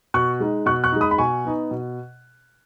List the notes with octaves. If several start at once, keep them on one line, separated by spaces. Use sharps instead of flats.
B2 C#6 F#6
G#3 D#4
B2 C#6 F#6
C#6 F#6
G#3 D#4
B5 D#6
B5
B2 G#5 C#6
B3 D#4
B2